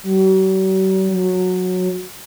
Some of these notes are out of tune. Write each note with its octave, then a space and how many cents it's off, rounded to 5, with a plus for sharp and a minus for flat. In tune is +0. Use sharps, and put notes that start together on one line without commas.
F#3 +45
F#3 -15